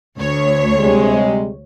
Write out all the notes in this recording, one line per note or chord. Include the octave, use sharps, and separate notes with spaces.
D2 C#5
C3 G3 G#3